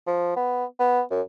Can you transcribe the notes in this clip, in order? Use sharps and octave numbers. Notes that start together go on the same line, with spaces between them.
F3
B3
B3
F#2